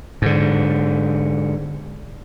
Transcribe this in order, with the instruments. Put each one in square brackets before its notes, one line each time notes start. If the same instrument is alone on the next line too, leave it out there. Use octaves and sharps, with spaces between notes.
[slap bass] G#2 D3